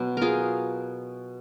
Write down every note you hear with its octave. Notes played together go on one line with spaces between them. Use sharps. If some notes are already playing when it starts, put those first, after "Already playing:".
Already playing: B2 F#3 B3
F4 G#4 A#4